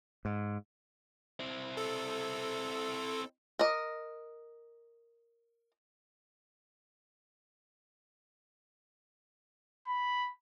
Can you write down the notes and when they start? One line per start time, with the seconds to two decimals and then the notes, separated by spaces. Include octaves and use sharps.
0.25 G#2
1.40 C4 E4
1.77 A4
3.59 A#4 D#5
9.87 B5